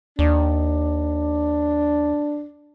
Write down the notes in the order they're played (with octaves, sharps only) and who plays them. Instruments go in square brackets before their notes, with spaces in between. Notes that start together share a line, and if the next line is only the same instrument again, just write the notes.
[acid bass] D#2 [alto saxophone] D4